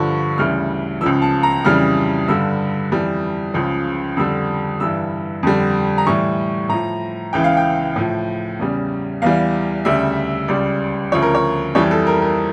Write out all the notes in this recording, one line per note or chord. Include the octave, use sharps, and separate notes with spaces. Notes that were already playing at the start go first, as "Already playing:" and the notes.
Already playing: G2 D3 F3 C#6
D2 C#3 E3 G3 F6
C#2 C#3 F3 E6
A5
A#5
F2 C#3 E3 G3 F6
G2 D3 G3 E6
F2 E3 G3
C#2 C#3 F3
F2 D3 G3 E6
G2 E3 G3 E6
F2 D3 G3
A#5
A2 E3 G3 C#6
A2 F3 A#5
C#2 C#3 E3 G5
F5
G5
A2 F3
E2 C#3 G3
E2 E3 G3 F5
D2 C#3 G3 E5
C#2 C#3 G3 D5
D2 C#3 F3 C#5
A#4
C#5
F2 E3 G3 C#5
A4
A#4
A#4